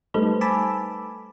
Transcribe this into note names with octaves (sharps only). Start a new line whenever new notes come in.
G3 A3 D#4 A4 B4 C5
G#5 A5 B5 D6 E6